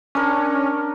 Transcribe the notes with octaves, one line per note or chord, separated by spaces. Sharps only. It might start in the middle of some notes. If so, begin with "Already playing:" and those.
C#4 D4 A#4